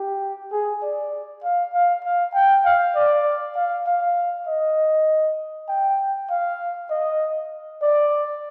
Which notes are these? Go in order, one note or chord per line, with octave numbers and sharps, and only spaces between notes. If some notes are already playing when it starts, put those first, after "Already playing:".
Already playing: G4
G#4
D5
F5
F5
F5
G5
F5
D5
F5
F5
D#5
G5
F5
D#5
D5